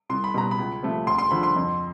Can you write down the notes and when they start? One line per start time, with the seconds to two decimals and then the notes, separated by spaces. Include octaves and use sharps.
0.09 C2 C6
0.24 B5
0.34 B2 G3 A#5
0.51 B5
0.58 C#2
0.82 C3 F3 A3
1.07 D2 C6
1.18 C6
1.31 D3 F3 B5
1.43 C6
1.56 F2